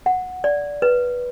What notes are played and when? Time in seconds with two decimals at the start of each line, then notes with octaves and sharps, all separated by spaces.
0.06 F#5
0.44 D5
0.82 B4